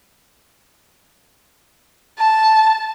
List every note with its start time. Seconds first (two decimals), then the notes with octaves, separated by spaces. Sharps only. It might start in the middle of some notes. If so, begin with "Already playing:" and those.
2.19 A5